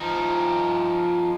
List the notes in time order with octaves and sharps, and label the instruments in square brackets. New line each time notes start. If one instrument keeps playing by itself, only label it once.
[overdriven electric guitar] F3 D#4